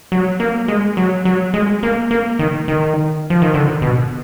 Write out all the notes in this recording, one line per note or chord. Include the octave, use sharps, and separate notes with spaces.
F#3
A#3
G#3
F#3
F#3
G#3
A#3
A#3
D#3
D#3
F3
D#3
D3
B2